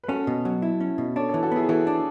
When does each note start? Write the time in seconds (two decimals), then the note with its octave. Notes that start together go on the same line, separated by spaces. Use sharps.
0.04 B4
0.09 C#4 F#4 A4
0.27 B2
0.45 F#3
0.62 E4
0.80 C#4
0.98 B2
1.16 D4 A4 C#5
1.29 A4 C#5
1.34 E3
1.43 F#4 A4
1.52 B3 E4 G#4
1.69 E3 F#4 A4
1.87 D4